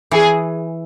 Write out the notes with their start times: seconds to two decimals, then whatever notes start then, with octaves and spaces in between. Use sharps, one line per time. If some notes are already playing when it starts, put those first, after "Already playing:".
0.11 E3 G#4